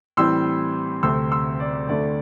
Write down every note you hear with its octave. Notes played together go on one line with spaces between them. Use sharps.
A2 E3 G3 C4 C6 E6
D2 C3 A3 C4 C6 E6
C6 E6
D5
D2 D3 A3 D5